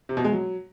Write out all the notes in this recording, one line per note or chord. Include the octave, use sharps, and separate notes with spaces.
C3
B2
G#3
F#3